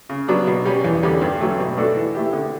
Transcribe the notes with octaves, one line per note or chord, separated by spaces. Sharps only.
C#3
F#3 B3 D4
B2
G3 C#4
E2
D3 G3 C#4
G2
F#3 A3 C#4
B2
A3 D4 F#4 A4
E3
A3 E4 G4
D3